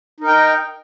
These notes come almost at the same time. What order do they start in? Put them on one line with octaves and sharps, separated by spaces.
D#4 A#4 G5